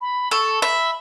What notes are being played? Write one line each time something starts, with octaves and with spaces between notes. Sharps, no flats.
B5
A4 C#6
E5 B5